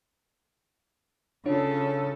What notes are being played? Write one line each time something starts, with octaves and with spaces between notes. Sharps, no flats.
C#3 D4 F4 A4 C#5